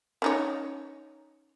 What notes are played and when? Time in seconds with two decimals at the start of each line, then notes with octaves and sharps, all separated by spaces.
0.22 C#4 D#4 C#5